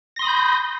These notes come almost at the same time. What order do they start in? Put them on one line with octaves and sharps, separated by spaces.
A#6 C6 D#6 B5 G6